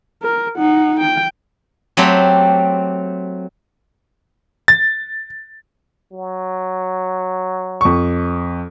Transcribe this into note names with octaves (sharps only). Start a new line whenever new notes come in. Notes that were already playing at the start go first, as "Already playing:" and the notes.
A#4
D#4 F#5
G5
F#3 A3 C4 G4
A6
F#3
F2 C#6